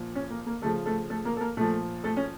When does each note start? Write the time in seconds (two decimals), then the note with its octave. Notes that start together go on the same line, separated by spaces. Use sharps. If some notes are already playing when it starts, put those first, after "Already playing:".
Already playing: A#2 F3
0.15 C#4
0.30 A#3
0.46 A#3
0.62 C#3 A3 A4
0.65 F3
0.86 A3 A4
1.10 A3 A4
1.25 A#3 A#4
1.37 A4
1.41 A#3 A#4
1.57 A#2 F3 A3 A4
2.04 A3 A4
2.17 C#4